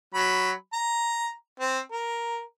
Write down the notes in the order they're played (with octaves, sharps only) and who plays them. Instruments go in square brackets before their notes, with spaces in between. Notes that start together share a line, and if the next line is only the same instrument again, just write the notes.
[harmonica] F#3 B5
A#5
C4
A#4